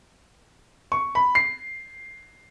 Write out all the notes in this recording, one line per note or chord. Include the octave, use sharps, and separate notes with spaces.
C#6
B5
C7